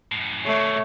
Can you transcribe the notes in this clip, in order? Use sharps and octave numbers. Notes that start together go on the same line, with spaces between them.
F#2 A2
B2 D3 A3 C#5